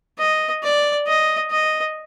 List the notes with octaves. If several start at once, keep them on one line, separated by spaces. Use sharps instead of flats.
D#5
D5
D#5
D#5